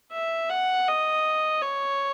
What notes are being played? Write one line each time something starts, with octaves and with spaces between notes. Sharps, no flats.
E5
F#5
D#5
C#5